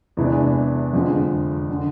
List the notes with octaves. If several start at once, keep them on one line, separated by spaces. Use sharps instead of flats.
E2 C3 E3 G#3 D4
F2 D3 F3 G#3
D3